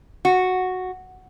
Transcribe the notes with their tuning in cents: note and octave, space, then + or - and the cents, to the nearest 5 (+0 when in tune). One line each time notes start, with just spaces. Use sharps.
F#4 -5